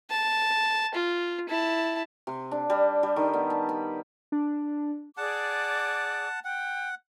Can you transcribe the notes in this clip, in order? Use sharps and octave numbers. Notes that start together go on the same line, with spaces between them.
A5
F4
E4 A5
C3
D4
G3
G3
D#3
B3
A5
B5
D4
G#4 D5 F#5 A5 D6
F#5 G5